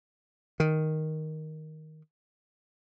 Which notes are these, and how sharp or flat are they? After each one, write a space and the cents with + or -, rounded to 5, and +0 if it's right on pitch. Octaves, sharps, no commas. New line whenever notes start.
D#3 +5